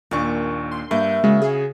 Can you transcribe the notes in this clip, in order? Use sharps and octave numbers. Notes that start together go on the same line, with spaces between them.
D#2 A#2 A#3 D4 C#6
C6
G2 A#3 E5 G6
C#3 G#3 F#4
G#4